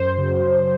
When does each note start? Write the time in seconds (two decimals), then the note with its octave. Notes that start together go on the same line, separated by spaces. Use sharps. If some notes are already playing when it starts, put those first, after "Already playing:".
Already playing: F#2 C5
0.17 C#3 F#3
0.43 F#2